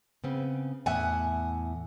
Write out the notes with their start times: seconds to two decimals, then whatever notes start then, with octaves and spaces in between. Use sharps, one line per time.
0.24 C#3 B3 C4
0.86 E2 A2 E5 F#5 G#5